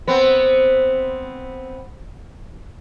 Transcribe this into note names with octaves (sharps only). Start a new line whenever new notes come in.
B3 C4